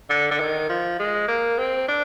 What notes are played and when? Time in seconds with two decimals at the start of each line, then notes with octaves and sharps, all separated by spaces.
0.10 D3
0.31 D3
0.40 D#3
0.69 F3
0.99 G#3
1.28 A#3
1.58 C4
1.88 D4